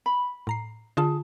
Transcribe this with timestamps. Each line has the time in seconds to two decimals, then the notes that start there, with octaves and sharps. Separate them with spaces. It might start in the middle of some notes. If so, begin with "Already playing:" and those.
0.06 B5
0.47 A2 A#5 C7
0.97 D3 F4 G#4 A5